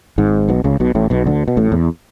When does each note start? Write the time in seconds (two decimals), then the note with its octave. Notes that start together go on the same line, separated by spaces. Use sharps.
0.18 G#1 G#2
0.49 B1 B2
0.64 C#2 C#3
0.80 B1 B2
0.95 A1 A2
1.10 B1 B2
1.26 D2 D3
1.48 B2
1.57 A1 A2
1.72 E2